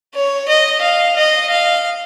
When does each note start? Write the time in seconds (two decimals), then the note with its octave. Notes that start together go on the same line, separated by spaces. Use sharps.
0.14 C#5
0.48 D#5
0.82 F5
1.16 D#5
1.50 F5